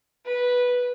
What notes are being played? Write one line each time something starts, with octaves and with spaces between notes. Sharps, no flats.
B4